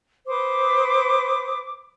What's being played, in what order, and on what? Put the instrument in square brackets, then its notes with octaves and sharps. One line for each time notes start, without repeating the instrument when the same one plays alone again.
[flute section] B4 C5 D#6 [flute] D6